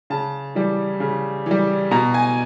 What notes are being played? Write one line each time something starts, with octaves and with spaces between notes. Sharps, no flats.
C#3 A5
E3 G3
C#3
E3 G3
B2 A#5
G#5